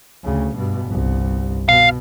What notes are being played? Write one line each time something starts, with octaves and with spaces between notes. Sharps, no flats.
D2 C#3
G2 B2
G1 C2
B2 F5